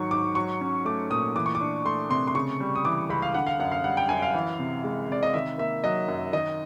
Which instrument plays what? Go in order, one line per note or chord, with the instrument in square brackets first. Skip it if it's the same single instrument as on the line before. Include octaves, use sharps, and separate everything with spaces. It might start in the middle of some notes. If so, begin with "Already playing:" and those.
Already playing: [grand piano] G#2 D#3 F#3 C#6
G#2 D6
F#3 C#6
C#4
A3 D6
A#2 D#6
E3 D6
C#6
D6
D4
A3 C6
C3 C6
C6
C#3 C#6
G3
D#6
E3 D6
C#2 B5
F5
D3 F#5
F5
F#2 F#5
F5
G3 F#5
G5
F#2 G#5
F5
E3
C3
G#3
C3 D5
D#5
D#3 E5
A#3 E5
F#3 D#5
F#2
D#3 D#5